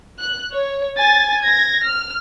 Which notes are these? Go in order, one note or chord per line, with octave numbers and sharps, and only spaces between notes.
F#6
C#5
G#5 A6
G#6 A#6
F6